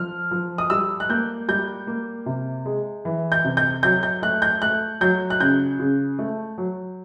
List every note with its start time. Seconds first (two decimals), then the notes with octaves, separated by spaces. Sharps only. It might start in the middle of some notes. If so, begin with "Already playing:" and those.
Already playing: F3 F6
0.31 F3
0.58 D#6
0.70 G3 E6
1.00 F#6
1.09 A#3 G6
1.48 G3 G6
1.87 A#3
2.26 C3
2.66 G#3
3.05 E3
3.32 G6
3.44 C3
3.57 G6
3.83 F#3 G6
4.03 G6
4.22 A3 F#6
4.42 G6
4.62 A3 F#6
5.01 F#3 G6
5.30 F#6
5.40 C#3 G6
5.79 C#3
6.19 A3
6.58 F#3